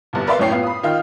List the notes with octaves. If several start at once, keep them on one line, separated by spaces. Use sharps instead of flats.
G1 C2
A#4 B4 D5 E5 F5 C6
F#2 A2 C#5 G5 C7
B3 F4
B5 D#6
D#3 F4 G5 F6